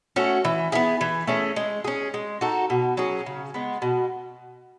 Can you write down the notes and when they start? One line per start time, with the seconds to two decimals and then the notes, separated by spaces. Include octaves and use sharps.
0.16 A3 C#4 F#4
0.45 E3
0.72 B3 E4 G#4
1.01 E3
1.27 A3 C#4 G#4
1.56 G#3
1.84 C#4 G#4
2.14 G#3
2.41 D#4 F#4 A4
2.70 B2
2.97 F#3 C#4 G#4
3.26 C#3
3.54 G#3 B3
3.82 B2